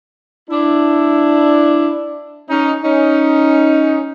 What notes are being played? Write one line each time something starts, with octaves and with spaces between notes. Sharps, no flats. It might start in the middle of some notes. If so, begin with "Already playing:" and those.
D4 E4
C#4 D#4
C#4 D#4